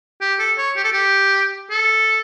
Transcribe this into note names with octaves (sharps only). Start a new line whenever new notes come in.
G4
A4
C#5
G4
A4
G4
A4